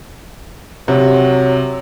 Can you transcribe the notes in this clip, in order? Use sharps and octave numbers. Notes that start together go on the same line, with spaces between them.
C3 F#3